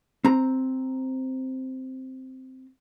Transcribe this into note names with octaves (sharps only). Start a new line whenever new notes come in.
C4 A#5